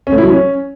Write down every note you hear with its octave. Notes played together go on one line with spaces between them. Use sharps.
C#4
A3
E4
F#3
C#4